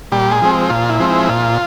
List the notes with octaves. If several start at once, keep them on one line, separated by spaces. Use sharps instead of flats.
A#2 G3 G4
G#3 G#4
F3 G#3 C4
A#2 F4
E4
F3 G#3 C4
E4
A#2 F4